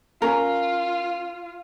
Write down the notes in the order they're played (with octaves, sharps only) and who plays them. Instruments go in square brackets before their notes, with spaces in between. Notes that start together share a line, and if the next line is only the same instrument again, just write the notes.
[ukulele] C#4 A#4 [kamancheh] F4